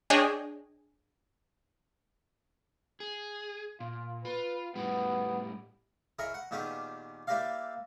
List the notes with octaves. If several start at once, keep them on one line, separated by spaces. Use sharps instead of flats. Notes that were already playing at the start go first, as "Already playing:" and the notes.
D4 G#4 C#5 D#5 G5 G#5
G#4
A#2 F4
F4 B4
A2 G3 B3
E4 G#4 A#4 C#5 D#5
F#5
A#2 D#3 B3 C#4 G4 G#4
A#3 E4 G4 D5 D#5 F5